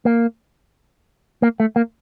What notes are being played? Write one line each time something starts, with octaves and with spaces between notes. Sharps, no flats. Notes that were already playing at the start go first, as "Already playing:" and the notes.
A#3
A#3
A3
A#3